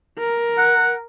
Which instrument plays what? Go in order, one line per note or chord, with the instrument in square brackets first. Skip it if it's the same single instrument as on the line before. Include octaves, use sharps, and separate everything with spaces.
[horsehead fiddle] A#4
[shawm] F#5